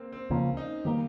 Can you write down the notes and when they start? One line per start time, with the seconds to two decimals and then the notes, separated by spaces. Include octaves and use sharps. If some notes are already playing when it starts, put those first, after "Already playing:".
Already playing: A#3 C4
0.12 C4
0.30 C#2 C#3 F3 A#3 C#4
0.57 D#4
0.85 D#3 G3 A#3 G4